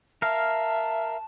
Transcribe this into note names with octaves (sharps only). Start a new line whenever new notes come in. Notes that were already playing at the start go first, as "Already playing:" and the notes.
A#4 E5 F5 A5